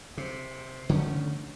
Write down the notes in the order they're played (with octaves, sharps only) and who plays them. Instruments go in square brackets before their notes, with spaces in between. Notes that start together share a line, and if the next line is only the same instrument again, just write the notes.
[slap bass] C3
D3 D#3 A3 C#4